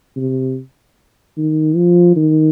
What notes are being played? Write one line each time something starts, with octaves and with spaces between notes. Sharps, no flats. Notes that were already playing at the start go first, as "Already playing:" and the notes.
C3
D#3
F3
D#3